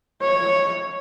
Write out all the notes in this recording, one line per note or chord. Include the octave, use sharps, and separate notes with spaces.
C#5